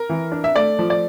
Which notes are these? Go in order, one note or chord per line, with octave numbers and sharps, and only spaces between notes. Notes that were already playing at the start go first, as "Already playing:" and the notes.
Already playing: A#4
E3
D4
E5
A3 D5
F3
D5